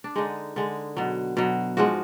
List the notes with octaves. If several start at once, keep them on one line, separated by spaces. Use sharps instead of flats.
D4
D3 G#3 D#4
D3 G#3
B2 F#3
B2 F#3
G#2 F3 G#3 F#4